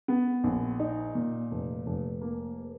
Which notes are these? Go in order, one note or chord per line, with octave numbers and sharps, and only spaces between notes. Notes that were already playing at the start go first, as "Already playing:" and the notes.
B3
A#1
D#4
A#2
F1
F1
A#3